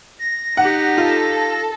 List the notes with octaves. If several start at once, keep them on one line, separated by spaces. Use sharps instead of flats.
A#6
D#4 G4 F#5
F4 A4